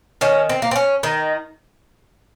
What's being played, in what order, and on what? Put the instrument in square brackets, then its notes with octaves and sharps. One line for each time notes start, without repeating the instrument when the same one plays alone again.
[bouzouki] D#3 C#4
C4
A#3
C4
C#4
D#3 D#4